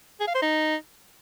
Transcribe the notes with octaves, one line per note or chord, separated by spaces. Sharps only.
G#4
F5
C5
D#4